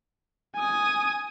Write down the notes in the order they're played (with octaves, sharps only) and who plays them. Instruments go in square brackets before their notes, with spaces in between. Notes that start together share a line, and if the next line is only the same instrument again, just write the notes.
[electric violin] G#5 D#6